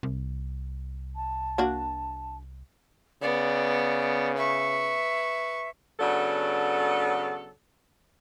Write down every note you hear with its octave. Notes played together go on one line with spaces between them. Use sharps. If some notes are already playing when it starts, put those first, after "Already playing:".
C2
A5
A#3 D4 F#4
C#3 B3 D5
B4 E5 C#6
C#3 F#3 B3 D4 A4